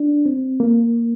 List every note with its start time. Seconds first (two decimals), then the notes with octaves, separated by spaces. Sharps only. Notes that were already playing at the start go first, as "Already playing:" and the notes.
Already playing: D4
0.26 C4
0.60 A#3